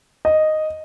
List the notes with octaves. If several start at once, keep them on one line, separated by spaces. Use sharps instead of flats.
D#5